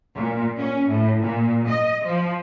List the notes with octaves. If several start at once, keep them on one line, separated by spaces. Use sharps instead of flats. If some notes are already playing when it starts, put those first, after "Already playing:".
A#2
C#4
A2
A#2
D#5
F3